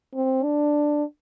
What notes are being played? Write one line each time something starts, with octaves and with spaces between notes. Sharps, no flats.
C4
D4